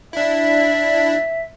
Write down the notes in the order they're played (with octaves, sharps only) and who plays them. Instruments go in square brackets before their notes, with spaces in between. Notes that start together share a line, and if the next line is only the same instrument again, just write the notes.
[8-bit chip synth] D4 E4 [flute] E5